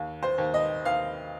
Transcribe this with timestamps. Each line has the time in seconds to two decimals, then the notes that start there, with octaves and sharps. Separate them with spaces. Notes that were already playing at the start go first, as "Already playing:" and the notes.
Already playing: D#2
0.23 C5
0.38 D#2
0.54 D#5
0.85 D#2 F5